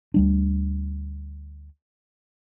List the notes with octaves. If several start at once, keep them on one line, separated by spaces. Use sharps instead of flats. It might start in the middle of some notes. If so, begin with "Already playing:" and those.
D2 G3 D4